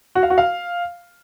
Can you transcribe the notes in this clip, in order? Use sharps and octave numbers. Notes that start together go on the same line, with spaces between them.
F#4
F5
F#4
F5